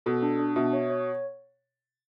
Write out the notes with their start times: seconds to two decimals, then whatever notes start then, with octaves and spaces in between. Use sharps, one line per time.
0.06 B2 A4
0.23 D4
0.39 D4
0.56 B2 E5
0.73 C#5
0.90 C#5